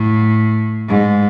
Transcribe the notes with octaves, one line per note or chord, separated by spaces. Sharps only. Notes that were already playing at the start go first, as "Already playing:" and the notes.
Already playing: A2
G#2